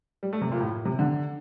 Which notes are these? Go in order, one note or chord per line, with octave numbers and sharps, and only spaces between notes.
G3
A3
C3
A#2
A2
C3
D3